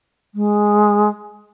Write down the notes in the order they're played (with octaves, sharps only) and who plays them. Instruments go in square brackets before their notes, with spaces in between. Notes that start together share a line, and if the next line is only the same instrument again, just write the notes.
[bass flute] G#3